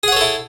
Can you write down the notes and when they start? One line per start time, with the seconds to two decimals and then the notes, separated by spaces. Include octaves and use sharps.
0.03 G#4
0.08 F#5
0.12 C#5
0.17 A4
0.21 E4